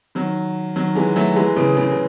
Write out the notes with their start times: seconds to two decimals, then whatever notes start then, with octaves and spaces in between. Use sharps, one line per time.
0.15 D#3 F#3
0.76 D#3 F#3
0.95 E3 G#3
1.16 F#3 A3
1.36 E3 G#3
1.56 C#3 E3
1.76 C#3 E3
1.92 C#3